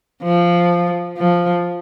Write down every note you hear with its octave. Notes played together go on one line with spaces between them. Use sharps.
F3
F3